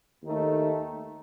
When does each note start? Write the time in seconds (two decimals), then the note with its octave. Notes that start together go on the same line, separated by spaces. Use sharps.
0.23 D#2 D#3 A3 D#4